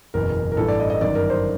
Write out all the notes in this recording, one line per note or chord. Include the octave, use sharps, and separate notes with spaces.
F#1 E2 B2 A#4
A#4
A1 G2 E3 A4
D5
D#5
D#5
G1 F#2 D#3 D5
A#4
C5